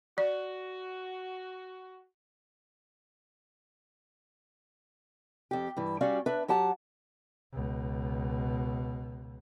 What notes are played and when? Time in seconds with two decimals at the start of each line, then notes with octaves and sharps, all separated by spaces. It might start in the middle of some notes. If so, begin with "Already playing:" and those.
0.18 F#4 D5
5.51 F2 G4
5.77 G2 E3
6.01 G3 C#4 F#4 D5 F5
6.26 D4 B4 E5
6.48 F#3 G4 F#5 A5
7.53 C#2 B2